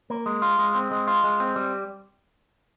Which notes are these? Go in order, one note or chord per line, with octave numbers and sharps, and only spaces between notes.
A#3
G#3
F4
G#3
C4
G#3
F4
G#3
C4
G3